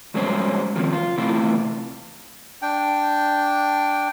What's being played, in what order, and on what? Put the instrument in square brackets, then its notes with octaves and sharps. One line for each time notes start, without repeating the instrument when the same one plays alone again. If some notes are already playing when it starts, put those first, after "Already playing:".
[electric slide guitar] G2 F#3 G#3 C#4 C5 C#5
C3 D#3 F3
F4
C3 E3 A3 E4 F4
[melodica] D4 G5